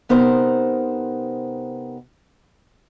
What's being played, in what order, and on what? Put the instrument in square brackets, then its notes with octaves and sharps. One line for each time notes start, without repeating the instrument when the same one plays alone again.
[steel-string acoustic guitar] C3 B3 D#4 A#4 C5